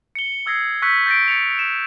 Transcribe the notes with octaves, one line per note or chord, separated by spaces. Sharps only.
C#7 G7
D#6 E6 G#6 A#6 C7
C#6 E6 F#6 G6 B6 C#7
G6 A6 A#6 D7
A6 C#7 F7
E7